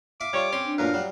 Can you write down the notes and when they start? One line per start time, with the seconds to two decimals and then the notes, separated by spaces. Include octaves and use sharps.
0.21 E5 F5 D6
0.33 G3 F4 C#5
0.53 C4 C#4 C#5 C6
0.66 D4
0.78 F#2 A#2 A3 A#4 B4 F5
0.94 F#3 G3